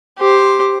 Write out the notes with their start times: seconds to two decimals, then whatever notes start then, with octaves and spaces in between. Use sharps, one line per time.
0.19 G4 C5